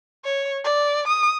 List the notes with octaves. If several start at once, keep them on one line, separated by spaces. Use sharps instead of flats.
C#5
D5
D#6